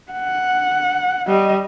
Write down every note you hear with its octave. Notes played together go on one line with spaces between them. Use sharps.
F#5
G3 D#5